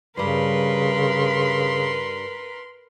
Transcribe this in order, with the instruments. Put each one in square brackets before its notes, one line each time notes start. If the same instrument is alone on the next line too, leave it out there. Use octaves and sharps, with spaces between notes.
[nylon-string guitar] G2 G3 [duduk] C#3 [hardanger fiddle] A#4 B4 [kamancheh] C6